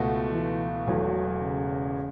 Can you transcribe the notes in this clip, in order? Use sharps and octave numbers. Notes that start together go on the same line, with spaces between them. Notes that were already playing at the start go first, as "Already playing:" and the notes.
Already playing: C#2 B2 A3 F#4
E3
E1 E2 E3 F#3 A3
C#3